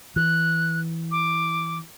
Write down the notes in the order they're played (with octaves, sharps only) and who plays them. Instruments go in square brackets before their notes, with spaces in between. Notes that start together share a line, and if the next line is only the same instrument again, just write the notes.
[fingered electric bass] E3 [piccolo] F#6
[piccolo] D6